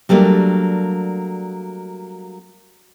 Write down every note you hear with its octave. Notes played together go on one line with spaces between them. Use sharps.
F#3 G3 A3 A#3 D4